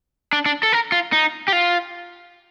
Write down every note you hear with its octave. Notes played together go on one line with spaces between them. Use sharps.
D4
D4
A4
A#4
F4
D#4
G4
F4